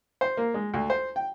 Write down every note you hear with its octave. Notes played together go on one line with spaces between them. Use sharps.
C5
A#3
G#3
D2
C5
G5